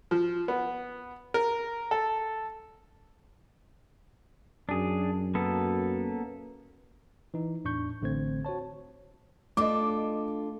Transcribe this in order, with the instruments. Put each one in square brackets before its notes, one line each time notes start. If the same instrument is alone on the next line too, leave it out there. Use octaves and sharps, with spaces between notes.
[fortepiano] F3
B3
A#4
A4
[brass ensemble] F#2 [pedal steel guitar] D4 G#4
[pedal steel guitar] A#3 B3 A4
[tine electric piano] E3 D#4
E2 A2 D4 C#6 G6
A1 D3 A3 C4 C5 G#6
F#4 C5 C#5 A5
[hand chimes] A3 [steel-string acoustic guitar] D4 F4 A4 [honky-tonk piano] D#5 D6